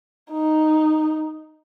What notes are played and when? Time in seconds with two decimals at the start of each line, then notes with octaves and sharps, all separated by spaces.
0.31 D#4